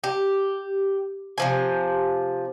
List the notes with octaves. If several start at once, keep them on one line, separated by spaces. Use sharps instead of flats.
G4
C3 F3 G#5